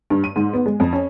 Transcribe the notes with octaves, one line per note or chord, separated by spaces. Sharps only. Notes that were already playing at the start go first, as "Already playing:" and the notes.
G2
D#7
G#2
B3
G#3
F2
C#4